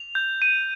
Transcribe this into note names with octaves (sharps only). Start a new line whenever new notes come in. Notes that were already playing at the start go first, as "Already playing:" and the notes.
Already playing: F7
G6
D#7